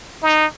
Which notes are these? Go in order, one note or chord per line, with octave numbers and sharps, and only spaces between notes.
D#4